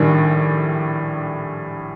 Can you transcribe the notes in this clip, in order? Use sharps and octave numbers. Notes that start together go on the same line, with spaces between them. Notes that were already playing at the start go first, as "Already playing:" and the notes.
Already playing: A#1 A2 D#3 G3 D4